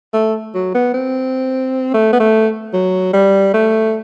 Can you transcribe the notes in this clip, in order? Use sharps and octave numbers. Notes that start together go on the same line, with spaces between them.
A3
F#3
B3
C4
A3
B3
A3
F#3
G3
A3